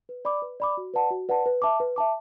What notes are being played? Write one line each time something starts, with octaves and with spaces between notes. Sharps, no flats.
B4
D5 B5 D6
B4
D5 B5 D6
F#4
B4 D5 F#5 A5
F#4
B4 D5 F#5 A5
B4
E5 A5 D6
B4
E5 A5 D6